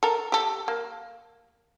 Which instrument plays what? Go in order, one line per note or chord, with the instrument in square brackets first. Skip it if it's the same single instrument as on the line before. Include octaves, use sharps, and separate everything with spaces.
[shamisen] A4 A#4
G4 A4
A#3